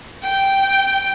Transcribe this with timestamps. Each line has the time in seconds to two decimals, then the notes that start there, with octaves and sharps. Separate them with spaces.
0.23 G5